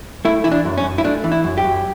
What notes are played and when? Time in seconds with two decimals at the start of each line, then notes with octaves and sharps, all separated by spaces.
0.25 A3 E4
0.44 E3 E4
0.52 D4
0.65 F#2
0.78 C#4
0.84 F#2
0.98 E4
1.04 A3 D4
1.24 E3
1.32 E4
1.44 F#2
1.58 G4
1.64 F#2